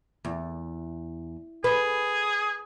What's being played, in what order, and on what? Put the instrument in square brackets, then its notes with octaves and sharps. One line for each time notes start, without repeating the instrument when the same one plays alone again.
[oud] E2
[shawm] G#4 [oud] B4